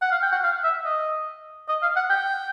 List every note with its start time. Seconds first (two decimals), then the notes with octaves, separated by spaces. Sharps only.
0.02 F#5
0.11 F5
0.22 G5
0.32 F#5
0.43 F5
0.64 E5
0.85 D#5
1.69 D#5
1.82 F5
1.96 F#5
2.10 G5